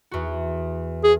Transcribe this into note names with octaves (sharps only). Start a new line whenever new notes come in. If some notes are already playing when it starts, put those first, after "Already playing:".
E2 F#4
G#4